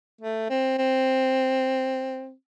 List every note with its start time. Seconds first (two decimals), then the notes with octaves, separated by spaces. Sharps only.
0.21 A3
0.50 C4
0.78 C4